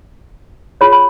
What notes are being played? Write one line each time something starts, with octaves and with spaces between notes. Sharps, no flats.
F4 G#4 C#5 B5
B5